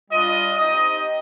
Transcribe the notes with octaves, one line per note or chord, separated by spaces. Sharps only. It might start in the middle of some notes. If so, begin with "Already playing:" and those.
G3 D4 F4 D#5
C4 D#4 G4 D#5